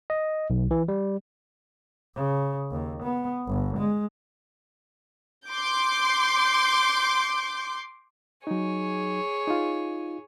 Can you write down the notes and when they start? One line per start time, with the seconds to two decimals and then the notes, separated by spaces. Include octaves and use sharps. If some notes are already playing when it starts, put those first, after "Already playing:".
0.10 D#5
0.50 B1
0.71 E3
0.88 G3
2.15 C#3
2.72 D#2
3.03 B3
3.47 G1
3.77 G#3
5.47 C6 D6 G6
8.47 F#3 D#4 G#4 C#5 G#5
9.48 D#4 F4